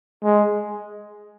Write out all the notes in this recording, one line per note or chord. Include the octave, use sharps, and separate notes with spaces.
G#3